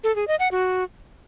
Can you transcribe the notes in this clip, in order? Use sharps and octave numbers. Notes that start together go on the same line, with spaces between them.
A4
G#4
D#5
F#5
F#4